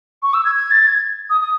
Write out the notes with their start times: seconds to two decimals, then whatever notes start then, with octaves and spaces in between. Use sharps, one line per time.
0.23 C#6
0.34 E6
0.45 G#6
0.55 G#6
0.71 A6
0.87 G#6
1.30 D#6
1.41 D#6